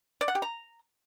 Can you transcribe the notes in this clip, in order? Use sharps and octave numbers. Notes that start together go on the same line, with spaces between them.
D5
F#5
G4
A#5